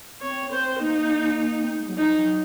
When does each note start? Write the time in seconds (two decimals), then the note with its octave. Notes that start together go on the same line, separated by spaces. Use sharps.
0.21 C4 C#5
0.51 C4 C5
0.81 A#3 D#4
1.62 C4
1.72 A#3
1.80 G#3
1.88 F#3
1.98 F3 D#4
2.17 F#3